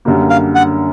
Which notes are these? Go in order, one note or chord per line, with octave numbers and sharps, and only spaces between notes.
F#2 D3 G3 A#3
F5
F#5